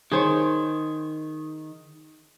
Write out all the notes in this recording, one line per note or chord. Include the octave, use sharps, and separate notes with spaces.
D#3 G#4 C5 C#5